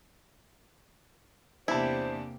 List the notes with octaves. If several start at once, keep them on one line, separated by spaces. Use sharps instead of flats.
E2 C3 A#3 D4 E4 G4 C5 A5